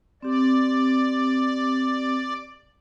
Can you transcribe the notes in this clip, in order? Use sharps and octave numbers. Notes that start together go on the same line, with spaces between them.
C4 G4 D5